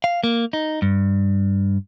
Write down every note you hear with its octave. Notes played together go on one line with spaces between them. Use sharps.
F5
A#3
D#4
G2